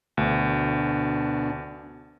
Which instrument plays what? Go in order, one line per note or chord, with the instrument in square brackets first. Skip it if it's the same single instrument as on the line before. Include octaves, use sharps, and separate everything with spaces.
[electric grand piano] D2 [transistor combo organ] B2 D4